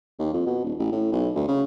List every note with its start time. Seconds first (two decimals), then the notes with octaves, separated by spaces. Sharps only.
0.19 D#2
0.33 F2
0.46 B2
0.64 D#1
0.79 A1
0.92 A2
1.12 B1
1.35 D2
1.48 C#3